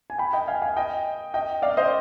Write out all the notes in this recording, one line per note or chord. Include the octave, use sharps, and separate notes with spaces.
G#5
G5 B5
D#5 G5
F5 G#5
F5 G#5
D#5 G5
D#5 G5
D5 F5
C5 D#5